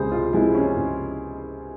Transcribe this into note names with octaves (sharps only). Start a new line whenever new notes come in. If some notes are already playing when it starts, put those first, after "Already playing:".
Already playing: C#2 C3 G#3 G#4 C5
F4
C3 F3 G#3 E4
C#4
C#2